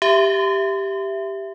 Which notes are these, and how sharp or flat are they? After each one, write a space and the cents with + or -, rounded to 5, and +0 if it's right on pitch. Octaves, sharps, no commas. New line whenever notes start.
G4 +0 E5 +10